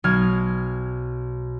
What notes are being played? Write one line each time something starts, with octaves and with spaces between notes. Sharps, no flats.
B1 F6 G#6